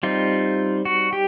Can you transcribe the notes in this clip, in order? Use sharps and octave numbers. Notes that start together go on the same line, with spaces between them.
G3 C4 D#4 F4
F#4
G4